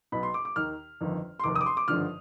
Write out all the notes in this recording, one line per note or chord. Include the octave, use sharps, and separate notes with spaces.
B1 B2 B5
C6
D6
D6
D#2 D#3 F6
G1 F2 D#3
C6
F1 D#2 D#3 D6
D#6
D6
C6
D6
G#1 G2 D3 F3 F6